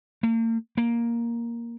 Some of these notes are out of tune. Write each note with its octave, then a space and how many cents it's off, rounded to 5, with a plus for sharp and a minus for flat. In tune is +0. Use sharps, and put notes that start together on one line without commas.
A#3 -40
A#3 +5